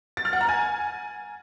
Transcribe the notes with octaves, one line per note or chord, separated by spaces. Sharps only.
A6
F6
F#5
A#5
G#5